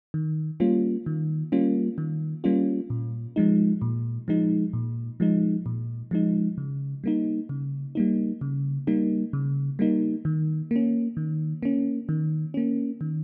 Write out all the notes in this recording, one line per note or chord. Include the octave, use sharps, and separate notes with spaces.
D#3
G3 A#3 C#4 F4
D#3
G3 A#3 C#4 F4
D#3
G3 A#3 C#4 F4
A#2
F3 G#3 D#4
A#2
F3 G#3 D#4
A#2
F3 G#3 D#4
A#2
F3 G#3 D#4
C#3
G3 A#3 D#4
C#3
G3 A#3 D#4
C#3
G3 A#3 D#4
C#3
G3 A#3 D#4
D#3
A#3 C#4
D#3
A#3 C#4
D#3
A#3 C#4
D#3